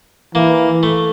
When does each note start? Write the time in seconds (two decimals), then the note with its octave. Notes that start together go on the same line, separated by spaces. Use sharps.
0.35 E3 A#3
0.83 A3